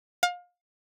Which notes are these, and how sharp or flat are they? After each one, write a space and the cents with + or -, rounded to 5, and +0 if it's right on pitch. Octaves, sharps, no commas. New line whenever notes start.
F5 +30